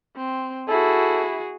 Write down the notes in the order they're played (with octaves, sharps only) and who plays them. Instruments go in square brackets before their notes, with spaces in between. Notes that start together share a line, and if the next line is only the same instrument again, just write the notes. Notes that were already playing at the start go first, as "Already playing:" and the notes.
[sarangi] C4
[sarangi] E4 [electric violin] F#4 G#4 [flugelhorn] A4